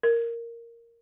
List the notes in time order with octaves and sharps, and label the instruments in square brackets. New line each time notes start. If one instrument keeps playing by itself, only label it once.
[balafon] A#4